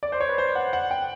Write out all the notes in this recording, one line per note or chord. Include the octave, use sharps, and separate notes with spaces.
D5
C5
C#5
B4
C5
F#5
F#5
G5